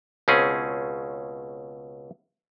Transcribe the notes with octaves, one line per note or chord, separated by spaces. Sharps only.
C#2 B2 C4 C#4 G#4